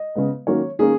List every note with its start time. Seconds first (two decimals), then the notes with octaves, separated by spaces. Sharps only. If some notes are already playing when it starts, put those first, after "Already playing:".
Already playing: D#5
0.15 C#3 G#3 B3
0.47 D#3 F#3 A#3 C#4 C#5
0.79 D#3 A#3 C#4 G#4